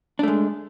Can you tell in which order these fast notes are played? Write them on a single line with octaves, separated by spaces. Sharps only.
D4 A3 G#3